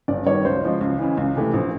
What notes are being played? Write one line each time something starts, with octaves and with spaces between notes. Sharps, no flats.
G1 D5
G2 D#3 F#3 C#5
C#2 C5
C#3 F3 G#3
C#2
C#3 E3
C#2
C3 E3 A3
A#1